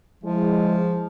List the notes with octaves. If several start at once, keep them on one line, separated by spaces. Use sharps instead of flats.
F3 G#3 E4